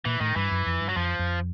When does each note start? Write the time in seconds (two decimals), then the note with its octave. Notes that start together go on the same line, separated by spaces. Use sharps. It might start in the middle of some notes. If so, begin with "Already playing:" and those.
0.05 A#2 E3
0.21 A2 D#3
0.36 G2 E3
0.51 F#2
0.66 F2
0.81 G2
0.89 F#3
0.96 F2 F3
1.19 F2